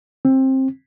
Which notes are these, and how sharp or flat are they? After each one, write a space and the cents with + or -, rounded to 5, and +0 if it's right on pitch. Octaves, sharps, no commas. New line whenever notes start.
C4 +20